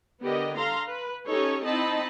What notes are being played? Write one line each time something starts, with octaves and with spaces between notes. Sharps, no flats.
D3 B3 G4 A#4 D#5
A4 F5 A#5 C6
B4
C#4 D#4 G4 A4 C#5
C4 D#4 E4 D#5 A5 B5